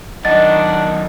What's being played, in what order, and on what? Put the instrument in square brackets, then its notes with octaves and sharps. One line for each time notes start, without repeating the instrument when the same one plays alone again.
[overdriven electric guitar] F#2 D#3 [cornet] D4 [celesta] D#5 A6 [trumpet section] F#5